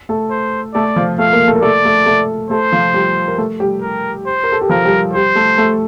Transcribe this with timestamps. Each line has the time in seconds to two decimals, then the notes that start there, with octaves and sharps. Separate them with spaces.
0.09 A3 A4
0.31 C5
0.74 A3 A4 D5
0.96 F3 F4
1.18 A3 A4 F5
1.33 A#3 A#4
1.48 A3 A4
1.55 A#4
1.63 A3 A4 D5
1.85 A3 A4
2.06 A3 A4
2.50 A3 A4 C5
2.72 F3 F4
2.94 G3 G4
3.28 A#4
3.38 A3 A4
3.60 G3 G4
3.82 A#4
4.27 C5
4.44 A#4
4.52 A4
4.61 G4
4.69 F3 F4 A#4
4.85 G3 G4
5.13 G3 G4 C5
5.35 A3 A4
5.58 A3 A4